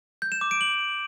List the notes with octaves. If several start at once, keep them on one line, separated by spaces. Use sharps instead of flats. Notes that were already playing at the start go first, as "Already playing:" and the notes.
G6
E7
D6
D7
F#7